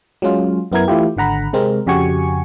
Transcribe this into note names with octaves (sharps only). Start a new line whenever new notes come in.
F#3 G#3 C#4 F4
F#2 B3 E4 A#4 G#6
E3 A3 E4 F4 G4
G#1 D3 F#5 A#5 B5
C3 G#3 C4 A#4
F2 C#3 F#4 G4 G#5 C#6